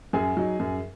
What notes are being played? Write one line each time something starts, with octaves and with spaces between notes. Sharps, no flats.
F#2 G#4 G#5
F#3 D#4
F#2